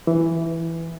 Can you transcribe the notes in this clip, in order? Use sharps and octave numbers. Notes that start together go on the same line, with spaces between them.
E3